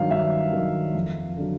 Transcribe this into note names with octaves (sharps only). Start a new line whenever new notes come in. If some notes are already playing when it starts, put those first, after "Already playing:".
Already playing: G2 D#3 F#3 F5
G2 E5
D#3 F#3
F2
D3 F#3